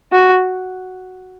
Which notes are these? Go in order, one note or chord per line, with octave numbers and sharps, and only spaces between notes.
F#4